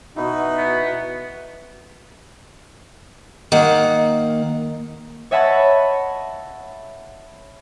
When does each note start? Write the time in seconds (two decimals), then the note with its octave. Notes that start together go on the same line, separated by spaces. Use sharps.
0.16 B2 D#4 E4 F#4 B4 D#5
0.57 B3
3.52 D#3 A#3 F#5
5.31 C#5 D#5 E5 F#5 A5 B5